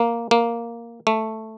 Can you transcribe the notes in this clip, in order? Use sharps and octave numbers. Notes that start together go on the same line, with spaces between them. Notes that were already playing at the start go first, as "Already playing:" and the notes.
Already playing: A#3
A#3
A3